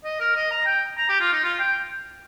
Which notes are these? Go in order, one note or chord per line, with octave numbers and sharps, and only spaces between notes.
D#5
A#4
D#5
A#5
G5
A#5
G4
F4
D#4
F4
G5